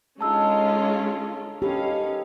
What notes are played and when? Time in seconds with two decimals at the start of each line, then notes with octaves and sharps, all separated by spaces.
0.21 D3 G#3 C#4 D#4 F4 A5 A#5 E6
1.62 D#3 B3 C#4 G4 A4 F5